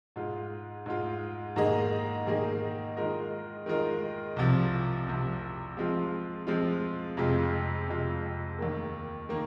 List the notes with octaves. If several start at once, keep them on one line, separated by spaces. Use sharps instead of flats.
G#2 G#3 F4
G#2 G#3 F4
G#2 D#3 A#3 G#4 D#5
G#2 D#3 A#3 G#4 D#5
D#3 G#3 F4 A#4 D#5
D#3 G#3 F4 A#4 D#5
C2 C3 F3
C2 C3 F3
F3 G#3 C4 F4
F3 G#3 C4 F4
F2 C3 G#3 F4
F2 C3 G#3 F4
D#2 D#3 A#3
D#3 A#3